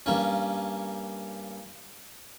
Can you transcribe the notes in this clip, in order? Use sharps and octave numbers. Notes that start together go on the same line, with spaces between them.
G2 A#3 C#4